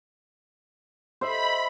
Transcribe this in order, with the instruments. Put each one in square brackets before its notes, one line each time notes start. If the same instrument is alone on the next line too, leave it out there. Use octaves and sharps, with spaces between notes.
[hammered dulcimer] C5 D#5 E5 [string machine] B5